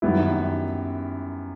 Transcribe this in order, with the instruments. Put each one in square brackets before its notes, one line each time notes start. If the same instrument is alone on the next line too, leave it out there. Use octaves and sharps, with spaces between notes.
[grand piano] F#2 D#3 G3 B3 E4